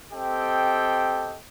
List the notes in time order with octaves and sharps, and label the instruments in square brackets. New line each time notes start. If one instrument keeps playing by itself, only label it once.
[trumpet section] C4 G4 A4 D#5 G5